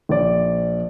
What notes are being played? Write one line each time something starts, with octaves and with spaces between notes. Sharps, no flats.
A#1 D5